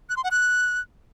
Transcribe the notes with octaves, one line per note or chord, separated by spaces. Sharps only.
F#6
C6
F#5
F#6